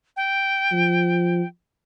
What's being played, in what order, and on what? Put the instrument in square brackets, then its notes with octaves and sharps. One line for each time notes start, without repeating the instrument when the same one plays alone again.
[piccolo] G5
[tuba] F3